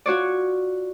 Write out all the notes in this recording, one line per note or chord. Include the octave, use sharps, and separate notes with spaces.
F4 F#4 C#5 D5